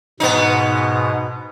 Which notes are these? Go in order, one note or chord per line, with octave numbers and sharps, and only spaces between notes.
G#2 B2 B3 D#4